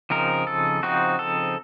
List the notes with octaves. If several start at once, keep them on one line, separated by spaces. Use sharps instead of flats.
C#3 F3 C4 D#4 A#4
A4
C#3 F3 C4 D#4 F#4
A4